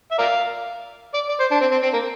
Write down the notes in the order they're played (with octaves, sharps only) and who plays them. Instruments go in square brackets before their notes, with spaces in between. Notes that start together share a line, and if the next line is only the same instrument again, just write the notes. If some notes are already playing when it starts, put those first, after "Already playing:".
[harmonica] E5
A#4 D5 F5
D5
D5
C5
D4
C4
C4
C4
A#3